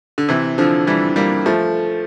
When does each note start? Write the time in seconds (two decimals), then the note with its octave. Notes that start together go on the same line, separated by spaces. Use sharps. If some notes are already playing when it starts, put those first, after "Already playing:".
0.18 D3
0.29 C3 E3
0.58 D3 F3
0.87 E3 G3
1.16 G3 A#3
1.46 F3 A3